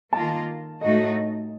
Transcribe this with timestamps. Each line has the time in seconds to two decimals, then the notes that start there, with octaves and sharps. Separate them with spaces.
0.12 D#3 A#3 F4 A5
0.81 A2 A3 D#4 F#4 D#5